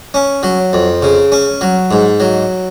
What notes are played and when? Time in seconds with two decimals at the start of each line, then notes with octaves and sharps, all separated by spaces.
0.14 C#4
0.43 F#3
0.73 F2
1.02 C#3
1.32 C#4
1.61 F#3
1.91 G#2
2.20 F#3